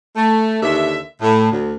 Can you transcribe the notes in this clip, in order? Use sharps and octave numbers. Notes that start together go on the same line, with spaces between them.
A3
D#2 D3 E5
A2
D2